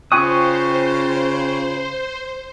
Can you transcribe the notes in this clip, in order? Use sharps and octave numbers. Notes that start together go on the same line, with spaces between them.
C#3 F4 C5 G5 G#5 C#6 D#6 F#6